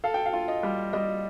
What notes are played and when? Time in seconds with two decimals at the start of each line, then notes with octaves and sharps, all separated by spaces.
0.04 A4 F5
0.14 G5
0.25 F5
0.33 F4
0.48 D#5
0.63 G3
0.93 G3 D#5